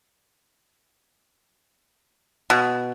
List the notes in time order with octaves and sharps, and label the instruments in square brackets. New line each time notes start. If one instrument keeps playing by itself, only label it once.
[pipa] B2